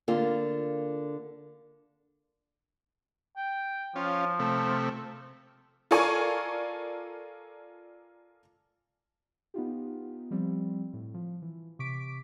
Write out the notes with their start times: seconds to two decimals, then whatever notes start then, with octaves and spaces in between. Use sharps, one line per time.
0.08 D3 A#3 F4
3.37 G5
3.96 F3 C#4 F4
4.39 C3 A3
5.91 F4 A4 A#4 D5 G#5 C#6
9.54 B3 D#4 F4 G4
10.31 F3 G3 C4
10.93 A2
11.14 F3
11.42 E3
11.79 C3 C#6 D6 B6 D7